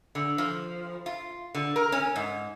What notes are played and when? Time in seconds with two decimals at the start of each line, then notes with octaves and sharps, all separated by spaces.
0.15 D3
0.38 F3
1.06 F4
1.55 D3
1.76 A#4
1.92 C#4
2.16 G#2